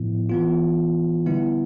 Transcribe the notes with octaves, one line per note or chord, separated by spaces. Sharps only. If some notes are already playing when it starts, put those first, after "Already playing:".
Already playing: A2 F3 B3 E4
E3 B3 F4
D3 G3 B3 E4